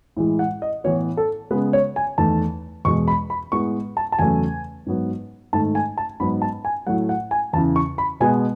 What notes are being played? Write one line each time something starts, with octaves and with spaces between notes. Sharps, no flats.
A2 E3 G#3
F#5
D#5
A2 E3 B3 C#5
A4
C#3 G#3 B3 B4
C#5
G#5
E2 D#3 A3 A5
E2 B2 G#3 C#6
B5
B5
A2 G#3 B3 C#6
A5
A5
E2 C#3 F#3 A3 G#5
G#2 F#3 B3
G#2 D#3 A3 A5
G#5
A5
G#2 F#3 B3 B5
A5
G#5
A2 F#3 A3 F#5
F#5
G#5
E2 C#3 E3 A5
C#6
B5
B2 G#3 B3 G#5